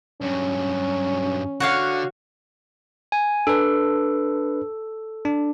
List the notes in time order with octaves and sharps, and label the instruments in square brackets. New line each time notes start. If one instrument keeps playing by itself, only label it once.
[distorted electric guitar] G2 F#3 [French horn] C#4
[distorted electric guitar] D3 [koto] F#4 C#5 F5
[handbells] G#5
[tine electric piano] D4 B4 [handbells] A4
[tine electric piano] D4